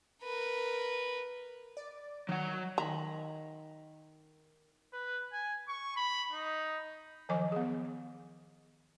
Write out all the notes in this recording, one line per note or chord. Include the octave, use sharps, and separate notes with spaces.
A#4 B4
D5
D#3 F#3 F#5
D#3 A#5 B5
B4
G#5
C#6
B5
D#4
D#3 F3 F#3 D#5 G#5 D6
B3 G#4